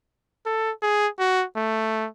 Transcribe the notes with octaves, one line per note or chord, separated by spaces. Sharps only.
A4
G#4
F#4
A3